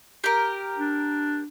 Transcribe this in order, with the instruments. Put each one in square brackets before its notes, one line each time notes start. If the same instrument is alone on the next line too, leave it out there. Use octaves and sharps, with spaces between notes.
[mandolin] G4 A#4
[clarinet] D4